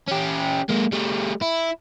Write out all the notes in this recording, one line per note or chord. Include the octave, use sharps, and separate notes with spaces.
C#4 G4
G#3 A#3
G3 A3
E4